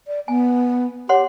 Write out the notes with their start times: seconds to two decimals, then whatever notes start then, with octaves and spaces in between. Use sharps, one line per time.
0.07 D5
0.28 B3 G#5
1.09 G4 C#5 F#5 C6